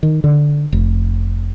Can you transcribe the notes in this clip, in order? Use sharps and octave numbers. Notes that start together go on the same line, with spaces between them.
D#3
D3
F1